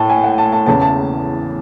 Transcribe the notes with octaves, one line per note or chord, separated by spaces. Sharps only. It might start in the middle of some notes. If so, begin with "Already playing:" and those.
Already playing: A2 A5
G#5
F#5
A5
A5
E2 C#3 E3 A5
A5